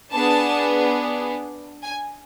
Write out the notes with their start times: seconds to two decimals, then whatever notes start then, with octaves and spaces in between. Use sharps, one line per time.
0.12 B3 D4 G#4 A5
1.84 G#5